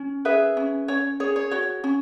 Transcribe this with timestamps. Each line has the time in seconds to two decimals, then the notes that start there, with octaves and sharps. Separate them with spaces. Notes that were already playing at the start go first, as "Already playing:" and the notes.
Already playing: C#4
0.25 G#4 B4 E5
0.57 C#4
0.88 C#4 C#5
1.20 G#4 C#5
1.36 C#5
1.51 F#4 C#5
1.84 C#4